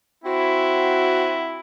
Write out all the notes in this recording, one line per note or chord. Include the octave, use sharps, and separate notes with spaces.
C4 E4 F#4